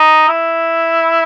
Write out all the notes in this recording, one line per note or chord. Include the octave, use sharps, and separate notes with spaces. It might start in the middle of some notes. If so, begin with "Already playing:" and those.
Already playing: D#4
E4